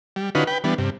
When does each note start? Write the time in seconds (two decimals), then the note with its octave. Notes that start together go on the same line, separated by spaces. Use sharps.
0.16 G3
0.35 D3 C#4 D#4 F4 F#4 B4
0.47 B4 G5
0.64 E3 G3 B3 D4
0.78 G2 C3